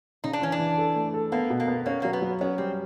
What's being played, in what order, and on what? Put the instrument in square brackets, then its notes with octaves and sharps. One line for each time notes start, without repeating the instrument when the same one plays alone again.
[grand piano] C#3 [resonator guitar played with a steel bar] D#4
[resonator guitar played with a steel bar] D4
[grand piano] E3 [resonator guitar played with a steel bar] C#4
[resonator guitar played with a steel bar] D4
[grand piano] E3
A4
A3
A4
[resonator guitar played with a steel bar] A#3 [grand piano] B3
[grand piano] B2
[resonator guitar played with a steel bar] A#3
[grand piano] B3
[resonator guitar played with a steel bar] A#3 [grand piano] C#4
[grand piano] F#3 [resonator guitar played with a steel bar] A#3
[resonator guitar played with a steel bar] B3
[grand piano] F#3
[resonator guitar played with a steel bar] B3 [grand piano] C#4
[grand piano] G3 [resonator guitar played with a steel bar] C4